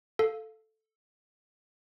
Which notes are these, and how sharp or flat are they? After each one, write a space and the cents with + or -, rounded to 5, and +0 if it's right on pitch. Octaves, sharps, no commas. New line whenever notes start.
A4 +0 F5 +0